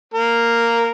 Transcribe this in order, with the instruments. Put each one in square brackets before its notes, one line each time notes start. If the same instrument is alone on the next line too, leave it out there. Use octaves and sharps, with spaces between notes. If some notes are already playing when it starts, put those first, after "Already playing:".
[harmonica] A#3 A#4